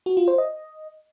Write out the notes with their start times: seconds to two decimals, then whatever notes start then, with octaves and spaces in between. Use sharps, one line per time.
0.06 F#4
0.17 F4
0.28 C5
0.38 D#5